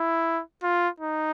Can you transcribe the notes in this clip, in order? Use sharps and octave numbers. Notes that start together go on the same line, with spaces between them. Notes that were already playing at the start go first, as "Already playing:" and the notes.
Already playing: E4
F4
D#4